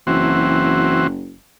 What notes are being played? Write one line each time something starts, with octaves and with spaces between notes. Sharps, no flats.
F#1 E3 C4 F#4